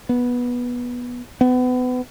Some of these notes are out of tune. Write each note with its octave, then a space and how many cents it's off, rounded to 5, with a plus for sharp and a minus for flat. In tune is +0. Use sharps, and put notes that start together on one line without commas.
B3 -15
B3 +30